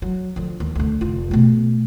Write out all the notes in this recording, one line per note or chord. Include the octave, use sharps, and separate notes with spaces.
F#3
D3 F3
D#2
D2 D3
F1 F4
B2 A3